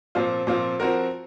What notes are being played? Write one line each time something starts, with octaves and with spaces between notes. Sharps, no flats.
A#2 F3 C4 F4
A#2 F3 C4 F4
F3 C4 F#4 A#4